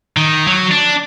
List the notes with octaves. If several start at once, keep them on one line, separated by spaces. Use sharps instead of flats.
D#3
F#3
D4